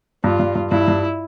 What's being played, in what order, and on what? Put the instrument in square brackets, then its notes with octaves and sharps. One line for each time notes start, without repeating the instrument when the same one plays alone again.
[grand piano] G2 [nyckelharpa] F4
[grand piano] G2
G2
[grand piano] G2 [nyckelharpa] E4
[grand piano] G2